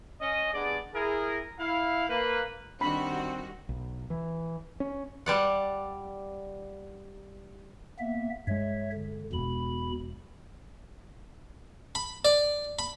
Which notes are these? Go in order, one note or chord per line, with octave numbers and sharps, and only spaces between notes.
C#4 D#5
G2 B3 G#4 D5
E4 G#4 A#4
E4 F5
A#3 B4
D#3 G3 C4 D4 F#4 B5
B1
E3
C#4
G3 D5 F#5
A#3 B3 E5
G2 G#3 C#5 E5
D3
E1 E2 B2 B5
B5
D5
B5